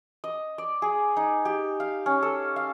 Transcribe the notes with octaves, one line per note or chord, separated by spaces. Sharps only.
D#5
D5
G#4
D#4
G4
F5
C#4
A4
F5